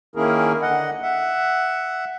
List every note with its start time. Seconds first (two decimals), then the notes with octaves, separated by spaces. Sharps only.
0.16 D#3 A#3 C#4 E4 G#4 A#4
0.62 D3 D#5 F#5
1.02 E5 F#5